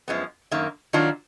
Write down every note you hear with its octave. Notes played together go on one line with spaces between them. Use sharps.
F#2 F3 G#3 B3
F#2 D#3 A#3
D#3 F#3 D4 F4